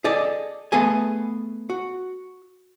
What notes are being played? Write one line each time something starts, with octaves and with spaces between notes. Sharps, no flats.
G#4 A4 D5 D#5
A3 B3 G#4 A4 G#5
F#4